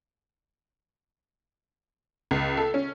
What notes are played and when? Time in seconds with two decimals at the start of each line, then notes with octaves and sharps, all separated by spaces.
2.31 C#2
2.57 A4
2.74 C#4